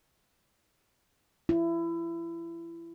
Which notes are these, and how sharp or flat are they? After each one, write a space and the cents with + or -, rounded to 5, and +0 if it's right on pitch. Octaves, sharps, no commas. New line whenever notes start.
E4 +25